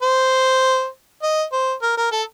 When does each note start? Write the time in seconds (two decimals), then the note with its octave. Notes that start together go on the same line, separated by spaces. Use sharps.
0.02 C5
1.22 D#5
1.52 C5
1.82 A#4
1.97 A#4
2.12 A4